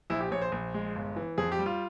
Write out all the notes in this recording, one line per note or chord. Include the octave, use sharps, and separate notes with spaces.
A#1 E4
G4
A#1 C#5
C5
A#1
G#3
G1
E3
F2 G#4
G4
G3
F4